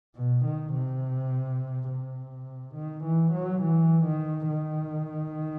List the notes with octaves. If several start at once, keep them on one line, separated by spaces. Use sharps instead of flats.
B2
D#3
C3
C3
D#3
E3
F#3
E3
D#3
D#3